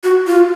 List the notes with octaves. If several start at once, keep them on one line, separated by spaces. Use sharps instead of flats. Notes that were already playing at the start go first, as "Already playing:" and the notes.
F#4
F4